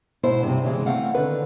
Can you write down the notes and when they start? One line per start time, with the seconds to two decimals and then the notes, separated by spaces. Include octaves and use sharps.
0.23 G#2 B2 E4 C5
0.43 G2 C3
0.64 C#3 E3 G#3
0.86 A3 C4 F5 F#5
1.14 D3 D#3 B4